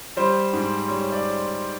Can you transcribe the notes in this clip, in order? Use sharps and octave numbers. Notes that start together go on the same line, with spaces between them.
G3 C5
G#2
G3 C#5
D5